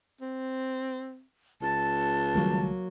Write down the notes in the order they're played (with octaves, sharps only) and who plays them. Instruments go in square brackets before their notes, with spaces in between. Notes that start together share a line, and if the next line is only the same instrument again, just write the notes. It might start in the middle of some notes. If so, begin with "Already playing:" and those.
[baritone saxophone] C4
[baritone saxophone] C#2 [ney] A5
[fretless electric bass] D#3 G3 A3 [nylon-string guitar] F#3 A#3